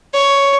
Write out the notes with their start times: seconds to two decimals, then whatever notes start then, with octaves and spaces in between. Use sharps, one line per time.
0.14 C#5